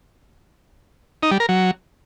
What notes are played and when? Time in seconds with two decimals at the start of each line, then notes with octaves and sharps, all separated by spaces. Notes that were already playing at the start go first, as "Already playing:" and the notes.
1.23 D#4
1.31 G3
1.40 A#4
1.49 F#3